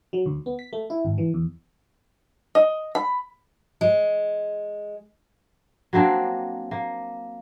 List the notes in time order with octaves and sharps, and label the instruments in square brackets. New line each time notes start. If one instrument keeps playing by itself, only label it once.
[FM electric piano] F#3
D2
B3
B6
A3
E4
G#1
E3
E2
[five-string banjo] D#5
B5
[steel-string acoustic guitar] G#3
[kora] F#3 A#3 C4 D4
A#3